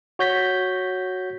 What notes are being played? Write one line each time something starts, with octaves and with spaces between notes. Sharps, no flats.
F#4 C#5 G6 A#6 B6